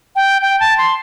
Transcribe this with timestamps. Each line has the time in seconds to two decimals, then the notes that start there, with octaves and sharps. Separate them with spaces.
0.16 G5
0.42 G5
0.60 A5
0.78 C6